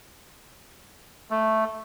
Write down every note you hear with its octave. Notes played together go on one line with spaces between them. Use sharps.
A3